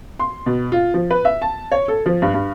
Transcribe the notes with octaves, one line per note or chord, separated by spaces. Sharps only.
C6
B2
F4
F3
B4
E5
A5
C#5
A4
F3
G2
G2